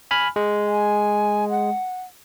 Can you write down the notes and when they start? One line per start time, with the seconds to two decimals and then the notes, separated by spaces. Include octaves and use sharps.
0.11 G#5 B5 F6
0.36 G#3
0.68 G#5
1.50 F#5